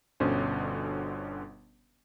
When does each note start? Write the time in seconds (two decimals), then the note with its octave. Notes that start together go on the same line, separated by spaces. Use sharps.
0.20 G1 B2 D3 C#4 C5